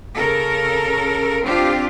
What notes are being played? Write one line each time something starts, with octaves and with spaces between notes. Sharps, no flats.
C#3 A4 A#4
C4 D4 F4 G4